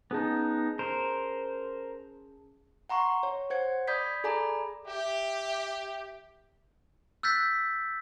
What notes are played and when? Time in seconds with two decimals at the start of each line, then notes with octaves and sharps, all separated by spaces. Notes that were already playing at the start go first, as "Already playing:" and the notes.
0.11 B3 C#4 D#4 G#4 A5
0.79 A#4 C5
2.89 F#5 A#5 C6 C#6
3.23 C#5
3.50 C5 F#5 G#6 C#7
3.87 D5 B5 D#6 G6 G#6 B6
4.24 G#4 A4 D5 G#5 A#5 B5
4.86 G4 E5
7.23 E6 F#6 G6 A6 B6